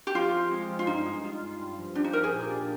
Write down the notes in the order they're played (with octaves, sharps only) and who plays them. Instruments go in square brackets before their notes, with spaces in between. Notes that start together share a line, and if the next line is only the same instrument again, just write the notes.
[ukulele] G4
[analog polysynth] F3 [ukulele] F4
[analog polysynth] C4
G#3
F3
[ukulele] F4
[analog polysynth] G2 [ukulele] D#4
[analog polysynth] G#3
F4
F4
G2
F3
[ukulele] D4 [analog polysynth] G4
[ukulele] D#4
[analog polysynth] G4 [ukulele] A#4
[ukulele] G#4
[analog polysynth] A#2
D4